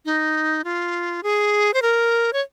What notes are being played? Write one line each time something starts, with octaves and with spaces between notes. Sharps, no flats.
D#4
F4
G#4
C5
A#4
C#5